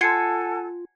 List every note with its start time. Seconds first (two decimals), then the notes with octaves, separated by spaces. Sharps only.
0.01 F4 A4 F#5 G#5 A5 G#6 C7 C#7